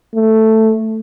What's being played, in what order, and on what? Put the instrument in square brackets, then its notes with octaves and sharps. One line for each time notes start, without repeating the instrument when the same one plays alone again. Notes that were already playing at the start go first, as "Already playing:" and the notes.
[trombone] A3